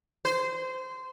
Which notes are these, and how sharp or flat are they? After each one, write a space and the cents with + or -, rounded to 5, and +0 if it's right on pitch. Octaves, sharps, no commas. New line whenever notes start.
C5 -20